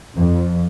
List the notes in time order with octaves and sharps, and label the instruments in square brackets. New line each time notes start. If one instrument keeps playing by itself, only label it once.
[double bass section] F2